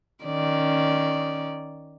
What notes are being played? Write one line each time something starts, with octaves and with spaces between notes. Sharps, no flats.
D#3 C#4 D5